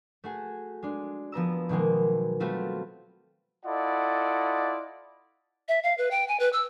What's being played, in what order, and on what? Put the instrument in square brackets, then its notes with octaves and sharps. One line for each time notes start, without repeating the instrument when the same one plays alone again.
[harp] A3 F#4 G#4
G#3 D4
F3 B3 A#5 E6
B2 D#3 F#3 G#3 A#3
G3 A3 C4 F4 F#4
[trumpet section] E4 F4 A4 D5 D#5 F#5
[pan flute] E5
F5
B4
G5
G#5
B4
E6